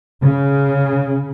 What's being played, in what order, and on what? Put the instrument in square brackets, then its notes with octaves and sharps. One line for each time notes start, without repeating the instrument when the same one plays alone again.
[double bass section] C#3